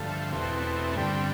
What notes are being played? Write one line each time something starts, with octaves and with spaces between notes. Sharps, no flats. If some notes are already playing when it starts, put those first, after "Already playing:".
Already playing: G2 D3 F3 A3
E2 B2 A3 C4
C4
G2 D3 G3 C4